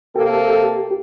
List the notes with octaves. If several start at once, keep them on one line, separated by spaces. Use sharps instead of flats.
C3 A#3 G4 A4